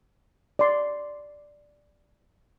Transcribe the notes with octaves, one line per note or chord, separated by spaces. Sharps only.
D5 C6